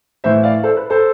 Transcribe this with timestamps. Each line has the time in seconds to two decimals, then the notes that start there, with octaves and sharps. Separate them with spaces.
0.24 A2 E3 C5 E5
0.43 D5 F5
0.63 A4 C5
0.77 B4
0.90 A4 C5